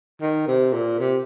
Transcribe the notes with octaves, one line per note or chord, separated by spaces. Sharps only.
D#3
C3
A#2
C3